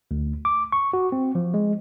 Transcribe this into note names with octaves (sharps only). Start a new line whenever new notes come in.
D2
D6
C#6
F#4
C4
F3
G#3